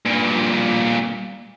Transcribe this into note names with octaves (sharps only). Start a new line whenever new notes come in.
G2 A#2